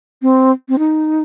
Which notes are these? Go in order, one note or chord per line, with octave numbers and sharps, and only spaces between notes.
C4
C4
D#4